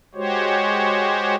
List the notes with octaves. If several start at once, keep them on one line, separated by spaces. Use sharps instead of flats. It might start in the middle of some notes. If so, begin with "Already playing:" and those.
G#3 F#4 G4 C5 C#5